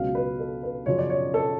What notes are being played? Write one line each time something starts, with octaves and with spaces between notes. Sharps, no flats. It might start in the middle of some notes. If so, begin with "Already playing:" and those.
Already playing: C#2 B2 F#3 F5
B4
A4
B4
F#2 C#3 F3 C#5
D5
C#5
A4